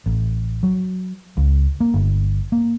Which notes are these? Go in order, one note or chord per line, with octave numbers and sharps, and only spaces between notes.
A1
F#3
C#2
A#3
G1
A#3